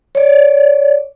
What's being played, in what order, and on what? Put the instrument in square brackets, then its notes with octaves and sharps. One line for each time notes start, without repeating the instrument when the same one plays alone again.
[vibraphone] C#5 D5